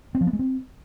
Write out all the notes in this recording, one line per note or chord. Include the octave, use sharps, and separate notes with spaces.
C4
F3
B3
G#3
C4